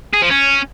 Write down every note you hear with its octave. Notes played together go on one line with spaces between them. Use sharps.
G#4
F3
C#4